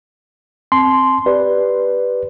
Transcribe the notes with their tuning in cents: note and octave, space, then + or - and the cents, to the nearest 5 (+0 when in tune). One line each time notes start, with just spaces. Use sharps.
C4 +5 A5 -35 C6 -5
G4 +0 B4 +0 D5 +0